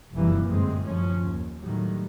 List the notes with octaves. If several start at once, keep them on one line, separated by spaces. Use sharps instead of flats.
F1 F#2 E3 G3 A#3
G1 F#2 A2 G#3 C4
F#2 F3 C#4
D#2
A2 D#3 F#3 G3